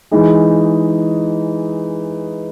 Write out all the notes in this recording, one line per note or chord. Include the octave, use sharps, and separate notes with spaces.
E3 G#3 D#4 G#4